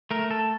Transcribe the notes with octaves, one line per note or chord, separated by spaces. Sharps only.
A3 A#4
A4